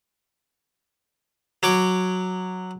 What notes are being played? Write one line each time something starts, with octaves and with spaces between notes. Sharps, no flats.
F#3 C#5 D6